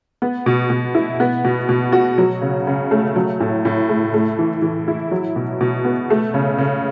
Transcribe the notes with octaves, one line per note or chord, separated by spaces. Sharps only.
B3
B2
B2
E4
B3
B2
B2
F#4
F#3
C#3
C#3
A3
F#3
A2
A2
A3
A3
E3
E3
E4
F#3
B2
B2
B3
A3
C#3
C#3